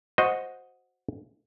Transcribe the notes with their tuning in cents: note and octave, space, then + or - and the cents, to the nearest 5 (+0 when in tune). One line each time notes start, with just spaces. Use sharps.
F#4 -10 C5 +0 D#5 +0